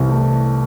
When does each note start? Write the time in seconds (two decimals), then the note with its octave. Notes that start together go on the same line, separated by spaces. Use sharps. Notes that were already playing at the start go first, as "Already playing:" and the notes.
Already playing: C2 C3 E3
0.09 A3